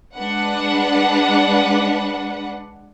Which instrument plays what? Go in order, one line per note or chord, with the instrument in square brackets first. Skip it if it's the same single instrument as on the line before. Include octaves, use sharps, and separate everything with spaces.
[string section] G#3 D4 B4 F#5